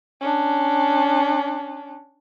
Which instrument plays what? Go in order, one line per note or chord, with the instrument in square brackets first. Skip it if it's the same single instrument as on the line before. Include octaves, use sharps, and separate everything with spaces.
[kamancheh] C#4 D4